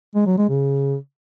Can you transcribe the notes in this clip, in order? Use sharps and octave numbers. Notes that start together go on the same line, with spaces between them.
G#3
F#3
G#3
C#3